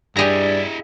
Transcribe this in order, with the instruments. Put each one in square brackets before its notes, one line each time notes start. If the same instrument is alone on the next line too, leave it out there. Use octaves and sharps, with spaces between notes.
[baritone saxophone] G2 [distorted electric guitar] E4 D#5 [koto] G4 G#4 A#5 [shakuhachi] D5